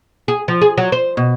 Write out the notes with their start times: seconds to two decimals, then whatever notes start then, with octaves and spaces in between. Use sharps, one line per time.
0.28 G#4
0.48 F3
0.62 G#4
0.78 F#3
0.92 C5
1.17 B2